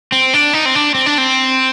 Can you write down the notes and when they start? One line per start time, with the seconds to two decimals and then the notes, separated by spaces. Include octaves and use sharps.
0.12 C4
0.34 D4
0.53 D#4
0.65 C4
0.75 D4
0.95 C4
1.06 D4
1.18 C4